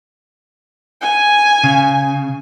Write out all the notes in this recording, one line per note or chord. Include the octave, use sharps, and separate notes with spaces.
G#5
C#3